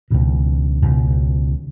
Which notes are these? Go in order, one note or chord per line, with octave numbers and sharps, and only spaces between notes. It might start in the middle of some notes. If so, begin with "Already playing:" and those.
C#2 B2 D#3
C#2 B2